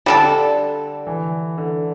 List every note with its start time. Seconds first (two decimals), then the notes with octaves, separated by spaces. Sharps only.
0.06 D3 G3 D4 A4
1.07 E3
1.58 D3